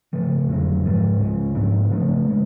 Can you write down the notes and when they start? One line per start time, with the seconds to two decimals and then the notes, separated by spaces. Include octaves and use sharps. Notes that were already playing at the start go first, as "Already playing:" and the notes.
0.13 C#3 F3 A3
0.48 F2 D3 F#3
0.85 G#2 F3 G#3
1.19 C#2 C#3 G#3
1.55 G#2 F3 B3 D4
1.89 C#3 F3 A3 D4
2.28 C#3 G#3